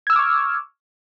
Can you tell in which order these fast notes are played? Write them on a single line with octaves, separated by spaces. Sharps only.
G#6 E6 F6 D6 C#6